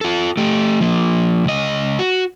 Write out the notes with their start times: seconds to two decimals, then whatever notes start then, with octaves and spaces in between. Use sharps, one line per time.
0.01 F4 A4
0.37 A3 G4
0.80 F3 A#3
1.45 C#2 D#5
1.99 F#4